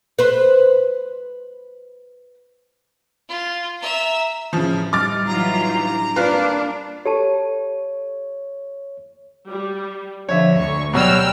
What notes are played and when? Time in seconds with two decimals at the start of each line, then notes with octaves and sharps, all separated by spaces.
0.19 B4 C5
3.29 F4
3.80 E5 A#5
4.53 A1 C#3 F3
4.93 G3 D#4 D6 F6 A6
5.27 E3 F#3 D#4 F4 A#5
5.69 D4 G6
6.16 A#3 C4 D4 F4 B4 F5
7.06 G4 A4 C#5 A5
9.48 G3
10.29 D3 F3 C#5 E5
10.57 D2 D3 C#6
10.93 B2 F#3 G3 G5 E6 F6